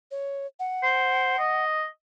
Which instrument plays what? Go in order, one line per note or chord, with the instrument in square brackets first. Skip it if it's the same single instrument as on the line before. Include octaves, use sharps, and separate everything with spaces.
[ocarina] C#5
F#5
[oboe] C5
D#5